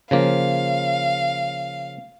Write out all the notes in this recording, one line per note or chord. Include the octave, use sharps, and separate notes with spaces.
C#3 F3 A#3 F5